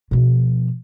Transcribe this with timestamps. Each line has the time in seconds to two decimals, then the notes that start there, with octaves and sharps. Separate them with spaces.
0.11 B2 F3